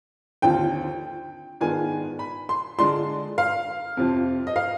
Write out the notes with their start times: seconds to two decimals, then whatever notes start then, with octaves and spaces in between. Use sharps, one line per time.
0.42 D#2 D3 F3 C4 F4 G5
1.61 G#2 D#3 B3 D4 F4 G#5
2.19 B5
2.49 C6
2.78 D3 G#3 D4 F4 C6
3.38 F5
3.97 F2 C3 F3 C4
4.47 D#5
4.56 F5